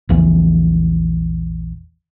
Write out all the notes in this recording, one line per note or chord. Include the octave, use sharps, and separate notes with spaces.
A#1 E2 E3